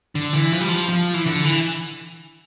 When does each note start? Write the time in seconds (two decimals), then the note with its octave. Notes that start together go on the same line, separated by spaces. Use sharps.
0.15 D3
0.33 E3
0.52 F3
0.61 G3
0.68 F3
0.89 F3
1.14 E3
1.26 D3
1.45 E3